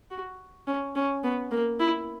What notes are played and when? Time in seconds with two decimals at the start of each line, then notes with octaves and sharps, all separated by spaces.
0.11 F#4
0.67 C#4
0.95 C#4
1.24 B3
1.51 A#3
1.80 E4